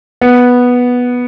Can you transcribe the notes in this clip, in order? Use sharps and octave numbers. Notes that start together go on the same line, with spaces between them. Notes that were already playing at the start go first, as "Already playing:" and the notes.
B3